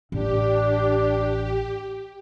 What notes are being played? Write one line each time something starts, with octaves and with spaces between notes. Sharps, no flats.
A1 D4 G4